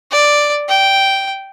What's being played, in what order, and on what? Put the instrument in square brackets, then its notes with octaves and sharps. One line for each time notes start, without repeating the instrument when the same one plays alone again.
[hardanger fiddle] D5
G5